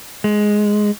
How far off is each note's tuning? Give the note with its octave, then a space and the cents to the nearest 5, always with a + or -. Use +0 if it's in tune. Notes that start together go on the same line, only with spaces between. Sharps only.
G#3 +5